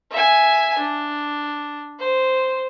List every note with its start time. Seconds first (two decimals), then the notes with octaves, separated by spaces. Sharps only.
0.11 E5 G#5
0.78 D4
1.99 C5